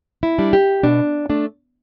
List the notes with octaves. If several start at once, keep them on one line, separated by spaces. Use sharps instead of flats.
E4
G3 D4
G4
B2 D4
A3 D4